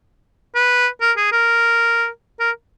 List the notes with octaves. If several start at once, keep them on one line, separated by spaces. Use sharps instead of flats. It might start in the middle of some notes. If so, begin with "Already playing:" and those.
B4
A#4
G#4
A#4
A#4